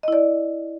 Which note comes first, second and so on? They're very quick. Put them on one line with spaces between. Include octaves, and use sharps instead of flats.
D#5 E4 D5